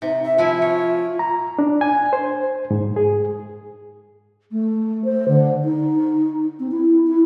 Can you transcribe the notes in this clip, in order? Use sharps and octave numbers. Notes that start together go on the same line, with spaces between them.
C3 D#4
E5
F3 E4 F4 G#5
C#5
A#5
D4
G#5
C5
G#2
G#4
A3
C5
D3
D#4
C4
E4
E4